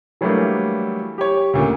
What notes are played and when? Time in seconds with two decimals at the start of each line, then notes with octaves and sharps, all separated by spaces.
0.21 E3 F#3 G3 A3 A#3 D4
1.18 G4 C#5
1.53 D2 A#2 C#3